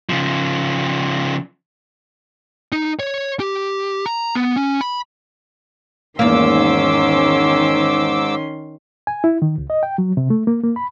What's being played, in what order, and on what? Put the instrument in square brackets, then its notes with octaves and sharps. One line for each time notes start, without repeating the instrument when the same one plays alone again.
[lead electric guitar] C#3 F3
D#4
C#5
G4
A#5
B3
C#4
B5
[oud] E2 A#3 [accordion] G#2 D6 E6 [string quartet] D#3 C#4 C6
[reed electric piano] G#5
E4
D#3
C#2
D#5
G5
F#3
C3
A3
A#3
A#3
B5